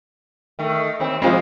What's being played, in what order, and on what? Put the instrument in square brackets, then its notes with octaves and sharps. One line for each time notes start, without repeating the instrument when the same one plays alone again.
[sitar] D#3 A3
D#2 C4
[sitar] C3 F3 [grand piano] G#3 C4 F4